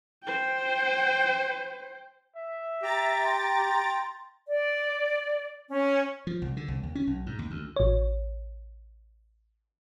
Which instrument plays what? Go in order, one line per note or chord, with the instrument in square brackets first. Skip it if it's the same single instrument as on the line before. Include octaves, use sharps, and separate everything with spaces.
[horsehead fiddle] C5 G5
[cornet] E5
[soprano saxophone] G4 [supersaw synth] A#5 A6
[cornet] G5 [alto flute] C6
[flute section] D5
C#4
[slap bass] F3
C2
D3
C2
D#2
C#4
B1
G#2
D#2
D2
[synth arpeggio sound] A1 C#5